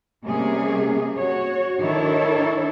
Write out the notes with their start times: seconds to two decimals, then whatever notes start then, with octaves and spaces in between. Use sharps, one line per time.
0.24 C3 G3 A#3 C#4 G#4
1.17 F#4 C#5
1.80 D#3 D4 E4 A4 C#5